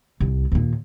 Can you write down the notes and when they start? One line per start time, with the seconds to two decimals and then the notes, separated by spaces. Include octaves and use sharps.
0.20 C2
0.52 D#2 A#2